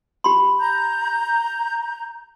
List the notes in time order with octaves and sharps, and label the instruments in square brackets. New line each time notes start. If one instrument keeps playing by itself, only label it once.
[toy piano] G4 B5 C6
[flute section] A#5 G6